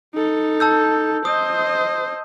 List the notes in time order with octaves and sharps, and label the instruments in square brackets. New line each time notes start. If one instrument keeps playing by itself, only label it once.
[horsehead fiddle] D#4 A4
[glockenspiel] A5 E6 G6
[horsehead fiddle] C5 D#5 [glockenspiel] D#6